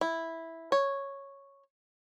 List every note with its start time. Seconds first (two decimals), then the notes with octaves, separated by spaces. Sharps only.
0.01 E4
0.72 C#5